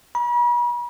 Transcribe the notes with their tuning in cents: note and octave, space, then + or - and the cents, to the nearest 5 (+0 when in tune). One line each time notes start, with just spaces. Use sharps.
B5 -45